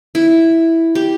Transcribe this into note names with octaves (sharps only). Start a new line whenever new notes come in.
E4
G4